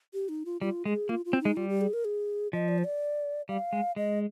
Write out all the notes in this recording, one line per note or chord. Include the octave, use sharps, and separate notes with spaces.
G4
D#4
F4
G3 F4
G#3 G#4
A#3 F4
F4
C4
G#3 D#4
G3 F4
G4
G#4
A#4
G#4
F3 D#5
D5
C5
D5
G3 F5
G#3
G#3 D#5